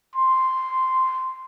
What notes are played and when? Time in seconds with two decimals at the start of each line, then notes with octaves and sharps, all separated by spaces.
0.15 C6